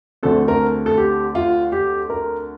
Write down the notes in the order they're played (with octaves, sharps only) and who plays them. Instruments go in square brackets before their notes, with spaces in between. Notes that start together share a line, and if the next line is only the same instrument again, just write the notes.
[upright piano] D2 D3 A3 C4 A4
A#4
A4
G4
F4
G4
A#4